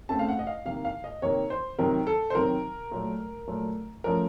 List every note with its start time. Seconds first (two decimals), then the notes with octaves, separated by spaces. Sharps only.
0.09 C#3 A3 C4 A5
0.19 F5
0.28 F#5
0.39 D#5
0.47 F5
0.65 C3 D#3 A#3 F5
0.85 F5
1.04 D#5
1.22 C3 D#3 A#3 C#5
1.50 C5
1.78 C3 D#3 F#3 C4 A#4
2.07 A4
2.30 C5
2.35 C3 D#3 F#3 C4 A#4
2.91 A#2 F#3 A3
3.48 A#2 F#3 A3
4.04 F3 A3 C#4 A#4